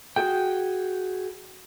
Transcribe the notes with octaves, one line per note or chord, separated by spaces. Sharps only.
F#4 G#4 G5